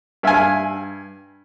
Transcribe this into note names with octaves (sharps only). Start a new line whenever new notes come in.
G2 E5 F5 G#5